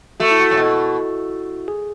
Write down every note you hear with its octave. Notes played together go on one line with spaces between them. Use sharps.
A3 F#4
E4
F#4
A2
B2
G#4